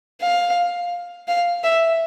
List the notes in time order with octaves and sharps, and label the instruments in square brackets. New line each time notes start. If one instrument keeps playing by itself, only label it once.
[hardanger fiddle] F5
F5
E5